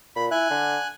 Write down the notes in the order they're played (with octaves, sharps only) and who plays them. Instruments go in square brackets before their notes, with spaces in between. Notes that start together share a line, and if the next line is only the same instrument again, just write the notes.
[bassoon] A#2 [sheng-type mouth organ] B5
[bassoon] E4 [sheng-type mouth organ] G#5 F#6
[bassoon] D3